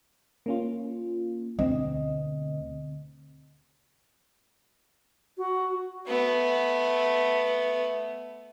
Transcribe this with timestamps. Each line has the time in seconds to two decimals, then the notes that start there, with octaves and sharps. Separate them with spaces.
0.46 A#3 C#4 F4
1.59 D2 B2 C4 D#5
5.38 F#4
6.07 A3 B3